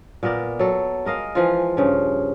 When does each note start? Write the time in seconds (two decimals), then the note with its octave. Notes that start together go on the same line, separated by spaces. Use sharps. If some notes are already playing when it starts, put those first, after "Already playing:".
0.23 A#2 B3 A#4 D5
0.59 F#3 A4
1.05 G#3 A#4 D#5 F5
1.35 E3 F3 F4
1.77 G2 C#3 F3